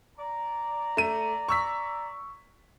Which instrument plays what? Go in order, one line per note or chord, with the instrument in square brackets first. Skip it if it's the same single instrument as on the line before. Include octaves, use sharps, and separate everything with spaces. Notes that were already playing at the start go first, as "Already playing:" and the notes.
[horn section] D5 A#5
[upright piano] A3 D#7
C#6 E6 B6